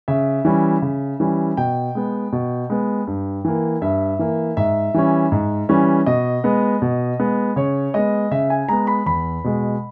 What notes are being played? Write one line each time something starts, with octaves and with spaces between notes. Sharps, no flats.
C#3 E5
E3 G3 C#4
C#3
E3 G3 C#4
B2 G5
G#3 B3
B2
G#3 B3
G2
E3 A#3
G2 E5
E3 A#3
G#2 E5
E3 G3 C#4
G#2
E3 G3 C#4
B2 D#5
G#3 B3
B2
G#3 B3
C#3 C#5
G#3 B3 D#5
C#3 E5
G#5
G#3 B3 A#5
B5
E2 B5
B2 G#3